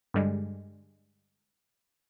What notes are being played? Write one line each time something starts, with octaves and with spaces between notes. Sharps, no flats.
G2 D3 G3 G#3